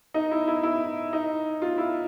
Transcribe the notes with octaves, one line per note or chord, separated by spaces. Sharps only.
D#4
E4
E4
E4
D#4
F4
E4